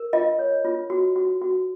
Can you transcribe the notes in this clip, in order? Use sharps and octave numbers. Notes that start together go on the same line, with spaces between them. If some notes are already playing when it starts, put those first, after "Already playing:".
Already playing: A#4
F4 D#5
C#5
F4
F#4
F#4
F#4